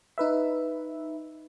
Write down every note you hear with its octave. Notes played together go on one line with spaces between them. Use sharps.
D#4 B4 E5